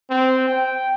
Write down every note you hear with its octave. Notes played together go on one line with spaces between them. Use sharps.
C4
G5